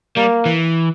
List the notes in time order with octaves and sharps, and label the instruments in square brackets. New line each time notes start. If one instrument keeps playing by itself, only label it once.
[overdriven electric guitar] G3 [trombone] A#3
[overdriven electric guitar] E3